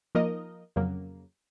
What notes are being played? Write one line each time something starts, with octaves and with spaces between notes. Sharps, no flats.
F3 A#3 D#4 A#4 D#5
F2 C#3 F#3 A#3